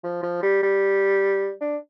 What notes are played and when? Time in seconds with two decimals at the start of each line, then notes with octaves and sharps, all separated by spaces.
0.04 F3
0.23 F3
0.43 G3
0.63 G3
1.61 D4